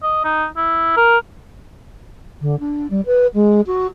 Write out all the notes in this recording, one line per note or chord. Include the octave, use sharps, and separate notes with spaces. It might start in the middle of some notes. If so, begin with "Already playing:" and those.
D#5
D#4
E4
A#4
D3
D4
G3
B4
G#3
F#4